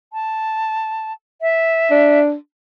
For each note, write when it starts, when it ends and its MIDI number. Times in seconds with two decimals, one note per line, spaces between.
0.13 1.12 81
1.41 2.19 76
1.91 2.34 62